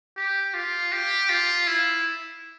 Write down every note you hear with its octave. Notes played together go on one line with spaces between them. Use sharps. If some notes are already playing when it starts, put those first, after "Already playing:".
G4
F4
G4
F4
E4